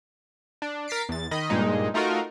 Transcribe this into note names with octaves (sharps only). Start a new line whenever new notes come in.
D4
A#4 A6 B6 C7 D7
E2 A6
D#3 D#5 B5
G2 A#2 G#3 D#4
A3 D#4 F4 F#4 A#4